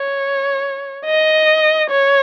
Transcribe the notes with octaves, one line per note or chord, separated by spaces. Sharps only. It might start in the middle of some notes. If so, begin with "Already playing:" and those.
Already playing: C#5
D#5
C#5